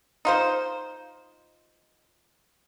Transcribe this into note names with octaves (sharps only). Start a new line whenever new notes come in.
D#4 F4 C5